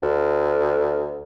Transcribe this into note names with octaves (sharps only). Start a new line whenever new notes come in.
D2